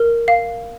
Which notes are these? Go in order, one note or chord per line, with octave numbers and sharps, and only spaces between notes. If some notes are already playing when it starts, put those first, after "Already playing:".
Already playing: A#4
F5